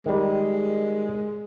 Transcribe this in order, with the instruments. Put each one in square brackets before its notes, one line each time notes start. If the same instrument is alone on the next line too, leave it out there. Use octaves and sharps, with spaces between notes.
[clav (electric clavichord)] D#3 G3 [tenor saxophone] G#3